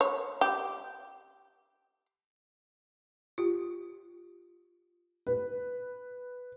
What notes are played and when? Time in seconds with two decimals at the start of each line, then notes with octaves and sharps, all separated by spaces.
0.01 C#5
0.41 G4
3.38 F4 G4
5.27 B4